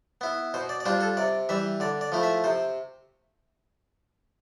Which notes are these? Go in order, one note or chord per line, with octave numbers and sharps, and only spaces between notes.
B3 E4
B2 C5
D5
D5
G3 D4 F4 C5
A4
C3 D5
E3 G3 E5
D3 D5
D5
F3 A3 E4
E5
C3 C5